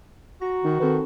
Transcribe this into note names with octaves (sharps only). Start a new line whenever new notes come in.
F#4 A#5
D#3 D#4
D#3 C4 A4 B4